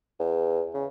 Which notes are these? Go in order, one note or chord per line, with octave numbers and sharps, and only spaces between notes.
E2
C#3